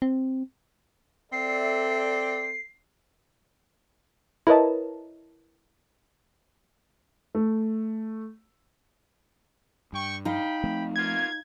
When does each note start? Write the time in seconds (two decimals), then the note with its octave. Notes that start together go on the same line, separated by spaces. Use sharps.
0.02 C4
1.32 C4 A4 D5 E5 C7
4.47 E4 A#4 B4 C#5 D#5 A5
7.35 A3
9.93 G2 G5 C#6
10.25 D#4 F5 G5 B5
10.64 F3 A3 C4
10.96 A#3 B3 F4 G#6